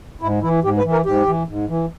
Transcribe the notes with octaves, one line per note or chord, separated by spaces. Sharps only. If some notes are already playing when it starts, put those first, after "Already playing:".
G#2 E4
E3 E4
G#2 G4
B4
E3
A#4
G#2 G4
E3
G#2
E3